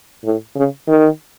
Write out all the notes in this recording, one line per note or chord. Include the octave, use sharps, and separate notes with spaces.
A2
C#3
D#3